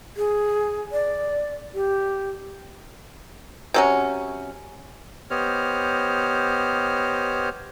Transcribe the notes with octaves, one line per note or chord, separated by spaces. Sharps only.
G#4
D5
G4
C3 F#3 C#4
B3 G4 C5 C#5 D#5 F6